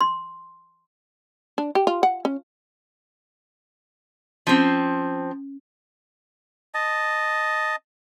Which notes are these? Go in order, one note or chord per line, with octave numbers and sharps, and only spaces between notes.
C6
D4
G4
F4
F#5
C#4
F3 C4 C#4
D#5 A5